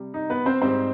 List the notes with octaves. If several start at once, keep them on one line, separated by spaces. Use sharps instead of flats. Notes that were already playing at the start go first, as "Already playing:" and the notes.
Already playing: C3 G3
D#4
B3 B4
C4 C5
G#2 G3 C4 C5